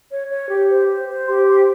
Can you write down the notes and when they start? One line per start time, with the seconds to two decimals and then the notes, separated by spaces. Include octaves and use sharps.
0.10 C#5
0.30 C#5
0.50 G4
0.69 C5
0.88 C5
1.08 C5
1.28 G4 C6
1.48 C5 C6